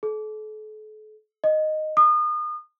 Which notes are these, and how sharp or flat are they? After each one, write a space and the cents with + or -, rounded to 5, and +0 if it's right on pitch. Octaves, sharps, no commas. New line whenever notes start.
A4 -40
D#5 -5
D#6 -35